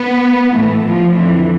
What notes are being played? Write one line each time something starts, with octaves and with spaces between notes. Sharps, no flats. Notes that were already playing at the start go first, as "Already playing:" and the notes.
Already playing: B3
A2 E3 A3
F3
F2 D3 E3